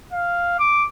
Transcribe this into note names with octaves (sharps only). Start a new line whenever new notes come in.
F5
D6